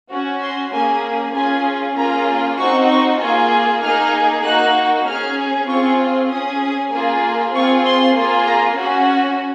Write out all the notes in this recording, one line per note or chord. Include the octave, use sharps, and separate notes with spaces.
C#4 F#4
C6
A#3 C#4 G#4 G#5
C#4 F4 G#4 G#5
A#3 C#4 F4 G#4 A#5
C4 D#4 F#4 C#6
C#6
A#3 F4 G#4
A#3 D#4 G#4 F6
A#3 D#4 F#4 F#6
C#4 G#4 F6
C4 F4 G#4 C#6
C#4 G#4 D#6
A#3 F4 G#4
C4 F4 G#4 C#6
C6
A#3 F4 G#4
A#5
C#4 F#4